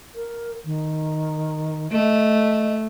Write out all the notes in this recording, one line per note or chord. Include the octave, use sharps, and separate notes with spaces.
A#4
D#3
A3 D#5